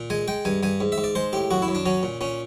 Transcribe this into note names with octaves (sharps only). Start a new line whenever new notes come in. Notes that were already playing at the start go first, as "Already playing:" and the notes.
Already playing: A#2
G#3 G#5
G#3 G5
G2 G#5
G2 G#5
G#2
E5
G#2
D5
G#3 C5
A2 G4
F#2 F#4
E4
F#2
D4
F#3 C#4
A#2
A#2 C#4